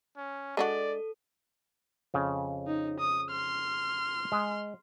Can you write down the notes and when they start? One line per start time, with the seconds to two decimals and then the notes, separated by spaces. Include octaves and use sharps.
0.17 C#4
0.57 G#3 D4 F#4 A4 D5
2.14 F2 C#3
2.67 D#4
3.00 D#6
3.31 C6 F6
4.32 G#3